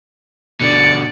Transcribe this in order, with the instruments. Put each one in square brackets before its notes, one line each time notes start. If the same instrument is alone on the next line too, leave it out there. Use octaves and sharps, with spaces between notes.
[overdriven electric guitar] B2 D3 [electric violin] D5 C#7